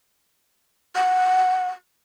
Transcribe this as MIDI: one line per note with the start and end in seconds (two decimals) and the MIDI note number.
0.96 1.69 78